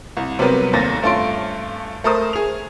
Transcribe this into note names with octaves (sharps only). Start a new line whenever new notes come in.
C2
C3 F#3 G3 B3 A#4
F1 D#2 C3 A6 A#6
G2 A3 C#4 F4 C6 D7
A3 A#4 C5 D#6
G#4 F7